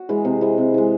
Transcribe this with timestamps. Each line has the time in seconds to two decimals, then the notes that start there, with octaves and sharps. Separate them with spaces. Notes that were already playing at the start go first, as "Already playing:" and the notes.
Already playing: F#4
0.09 E3 G#3
0.25 C3
0.41 E3 G#3
0.58 C3
0.74 E3 G#3